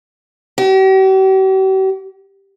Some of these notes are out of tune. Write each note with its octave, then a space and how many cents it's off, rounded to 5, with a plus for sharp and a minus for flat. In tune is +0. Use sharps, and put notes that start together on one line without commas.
G4 -45